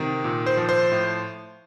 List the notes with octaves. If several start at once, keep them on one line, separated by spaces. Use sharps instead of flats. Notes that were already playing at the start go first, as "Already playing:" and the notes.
Already playing: C3 D#3
A#2
C5
F3
C5
A2